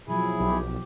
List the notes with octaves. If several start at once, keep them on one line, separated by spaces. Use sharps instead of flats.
B2 F3 F#3 E4 G#4
B1 G4